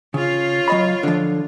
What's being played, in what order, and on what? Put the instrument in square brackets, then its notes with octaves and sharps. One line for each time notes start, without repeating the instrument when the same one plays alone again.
[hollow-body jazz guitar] C#3 [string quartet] F4 C#5 F5
[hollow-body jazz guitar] F#3 D#5 B5
D3 F3